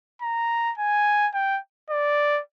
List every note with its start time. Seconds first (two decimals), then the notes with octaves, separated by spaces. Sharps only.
0.22 A#5
0.78 G#5
1.34 G5
1.90 D5